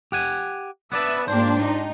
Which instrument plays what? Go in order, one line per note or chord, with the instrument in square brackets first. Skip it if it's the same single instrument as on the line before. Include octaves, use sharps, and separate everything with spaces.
[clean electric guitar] G4 F#5 G#5
[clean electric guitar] B3 D5 A5 [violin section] B4 E5 E6
[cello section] G#2 A#3 [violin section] D4 F4 G4 [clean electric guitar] C5
[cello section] D#4